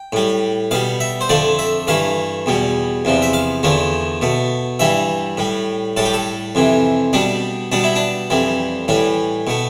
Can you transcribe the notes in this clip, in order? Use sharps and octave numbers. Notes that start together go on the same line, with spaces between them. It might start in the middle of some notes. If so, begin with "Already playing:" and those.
Already playing: G5
A2 G3
B2 G3 F5
E5
C5
F2 D3 F3 A3 D5
E5
G2 E3 A3 F5
E2 B2 G3
E2 C3 F3
E5
F5
E2 D3 F3 A3
B2 A3
G2 E3 G3 E5
A2 G3
A2 G3 A4
G4
A4
F2 C3 E3
B2 G3 D4
B2 G3 D4
E4
D4
F2 E3 G3
A2 E3 G3
B2 A3